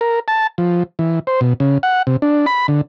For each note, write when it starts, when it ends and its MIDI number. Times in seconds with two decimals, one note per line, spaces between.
0.01 0.20 70
0.28 0.47 81
0.58 0.83 53
0.99 1.19 52
1.27 1.40 72
1.41 1.53 47
1.60 1.78 49
1.83 2.02 78
2.07 2.16 48
2.22 2.46 62
2.46 2.67 83
2.68 2.81 50